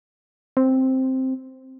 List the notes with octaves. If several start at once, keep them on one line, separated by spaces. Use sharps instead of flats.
C4